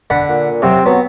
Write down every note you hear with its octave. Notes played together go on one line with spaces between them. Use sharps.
D3 F#5 B5
A#2
C3 F#3 C4
F#3 B3